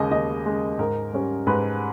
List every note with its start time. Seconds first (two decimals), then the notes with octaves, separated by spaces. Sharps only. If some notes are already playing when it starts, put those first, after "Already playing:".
Already playing: D#2 C#3 G#3 D#5
0.11 D#2 D#5
0.46 C#3 G#3
0.79 G#2 A#4
1.13 G3 C#4
1.47 G#2 B4